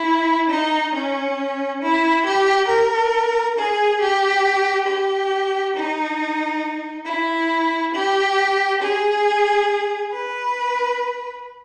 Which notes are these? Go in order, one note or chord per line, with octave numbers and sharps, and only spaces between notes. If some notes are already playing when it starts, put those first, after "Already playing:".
Already playing: E4
D#4
C#4
E4
G4
A#4
G#4
G4
G4
D#4
E4
G4
G#4
B4